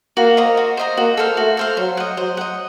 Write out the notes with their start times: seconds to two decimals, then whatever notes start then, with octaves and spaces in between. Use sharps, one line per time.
0.17 A#3 F#4
0.37 C5 D#5 A#5
0.57 F#4
0.77 C5 D#5 A#5
0.97 A#3 F#4
1.17 A4 C5 F5
1.37 A3 F#4
1.57 A4 C5 F5
1.77 F#3 C5
1.97 D#5 F#5
2.17 F#3 C5
2.37 D#5 F#5